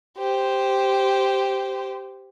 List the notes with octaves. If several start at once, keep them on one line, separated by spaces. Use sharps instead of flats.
G4 C5